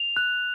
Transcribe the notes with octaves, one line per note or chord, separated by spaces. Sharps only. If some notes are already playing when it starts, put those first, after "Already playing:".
Already playing: F7
F#6